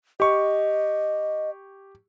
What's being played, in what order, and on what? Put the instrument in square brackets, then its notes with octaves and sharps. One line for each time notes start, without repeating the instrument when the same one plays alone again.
[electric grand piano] G4 C#6 [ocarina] D#5